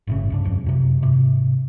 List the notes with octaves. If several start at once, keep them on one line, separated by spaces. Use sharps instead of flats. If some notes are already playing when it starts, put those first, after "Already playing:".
G1 A2 C#3
C2 G2 D4
C2 F2
F#2 C3
G#2 C3